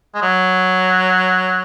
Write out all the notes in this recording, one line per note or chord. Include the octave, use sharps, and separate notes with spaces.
G#3
F#3